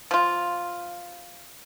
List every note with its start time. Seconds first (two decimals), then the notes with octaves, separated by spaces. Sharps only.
0.11 F3 F4